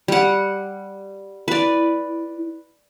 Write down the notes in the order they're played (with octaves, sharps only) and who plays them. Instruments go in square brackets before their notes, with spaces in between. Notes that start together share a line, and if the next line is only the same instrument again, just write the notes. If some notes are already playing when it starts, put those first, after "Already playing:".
[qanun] G3 F#5
[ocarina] E4 [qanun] B4 D5